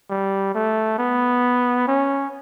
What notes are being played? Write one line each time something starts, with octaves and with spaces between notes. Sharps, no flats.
G3
A3
B3
C#4